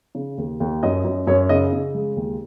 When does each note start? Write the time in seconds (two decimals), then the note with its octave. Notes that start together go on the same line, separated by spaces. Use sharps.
0.15 C#3
0.38 D#2
0.60 D#2
0.83 F#2 D#5
1.04 F#2
1.27 F#2 C#5
1.49 C#3 D#5
1.73 C#3
1.95 G#3
2.17 D#2